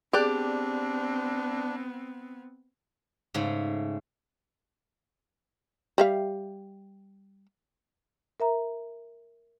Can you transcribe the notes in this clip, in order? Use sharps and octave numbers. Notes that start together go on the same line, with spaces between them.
B3 C4 D4 G4 G#4 D5 F#6
G#2 C#3 A3
G3 E5 F5
A#4 E5 A#5